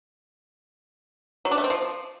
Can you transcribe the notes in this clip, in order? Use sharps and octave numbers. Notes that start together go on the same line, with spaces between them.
F#3
D4
A3
C4
F3